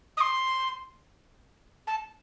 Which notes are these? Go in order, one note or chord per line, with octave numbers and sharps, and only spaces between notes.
D#6
C6
A5